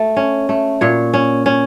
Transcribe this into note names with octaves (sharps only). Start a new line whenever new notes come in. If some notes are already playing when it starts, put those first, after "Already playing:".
Already playing: A3
C#4
A3
A#2 C#5
C#4
C#4